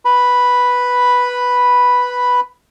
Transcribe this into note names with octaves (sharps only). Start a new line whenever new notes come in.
B4 B5